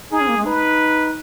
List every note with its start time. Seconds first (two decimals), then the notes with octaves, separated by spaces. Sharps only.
0.11 D#4 G#4
0.21 C#4
0.29 A#3
0.37 G#3
0.46 D#4 B4